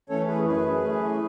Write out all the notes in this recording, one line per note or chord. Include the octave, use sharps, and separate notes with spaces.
E3 A3 C#4 A4 C#5
G#4 B4
F#2 G#4 B4
E3 A3 C#4